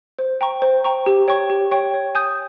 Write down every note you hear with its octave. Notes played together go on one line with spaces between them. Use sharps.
C5
G5 A#5 C#6
C5
G5 A#5 C#6
G4
C#5 G5 C#6
G4
C#5 G5 C#6
C#5
G#5 D#6 G6